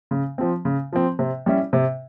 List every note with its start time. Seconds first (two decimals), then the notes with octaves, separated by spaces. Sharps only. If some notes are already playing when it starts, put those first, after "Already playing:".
0.11 C#3
0.38 F3 C4
0.65 C#3
0.93 F3 C4
1.19 C3
1.46 G3 C#4 E4
1.73 C3